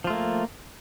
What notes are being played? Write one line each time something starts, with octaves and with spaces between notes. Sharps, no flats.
F3 A3 A#3 F4